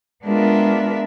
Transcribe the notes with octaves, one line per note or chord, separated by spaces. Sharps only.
G#3 B3 D4 F4 A#4 E5